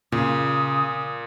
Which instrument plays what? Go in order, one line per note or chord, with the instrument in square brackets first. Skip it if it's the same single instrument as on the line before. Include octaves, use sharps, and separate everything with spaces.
[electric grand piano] A#2 [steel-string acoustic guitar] C#3 [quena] D#6